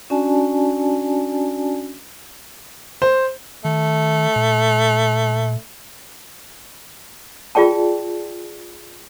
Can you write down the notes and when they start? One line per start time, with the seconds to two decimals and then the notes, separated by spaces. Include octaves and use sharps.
0.10 C#4 D4 F#4 D5 G#5 A5
3.02 C5
3.65 D#3 A3
4.36 A#2
7.55 F4 G#4 D5 G5 A5